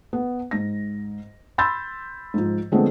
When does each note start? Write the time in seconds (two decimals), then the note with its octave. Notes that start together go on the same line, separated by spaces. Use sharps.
0.13 B3
0.51 G#2 A#6
1.58 B5 C6 E6 G6 A6
2.34 G#2 F3
2.72 D3 F3 G#3 A3 B3 C4